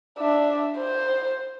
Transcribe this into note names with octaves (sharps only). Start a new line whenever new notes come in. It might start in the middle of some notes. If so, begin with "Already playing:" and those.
D4 E5
C5